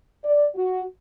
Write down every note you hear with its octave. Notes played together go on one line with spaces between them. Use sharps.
D5
F#4